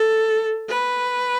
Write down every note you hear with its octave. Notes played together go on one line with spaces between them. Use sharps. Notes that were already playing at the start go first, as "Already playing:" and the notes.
Already playing: A4
B4